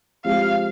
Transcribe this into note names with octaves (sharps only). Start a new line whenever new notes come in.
F3 G#3 C4 G4 F5